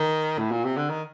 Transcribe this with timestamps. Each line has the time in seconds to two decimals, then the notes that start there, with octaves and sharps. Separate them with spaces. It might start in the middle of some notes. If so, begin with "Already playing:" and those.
Already playing: D#3
0.38 A2
0.51 A#2
0.64 C3
0.77 D3
0.90 D#3